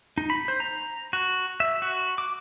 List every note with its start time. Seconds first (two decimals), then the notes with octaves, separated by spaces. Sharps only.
0.18 D#4
0.30 B5
0.48 C5
0.60 A#5
1.13 F#4
1.60 E5
1.82 F#4
2.18 D6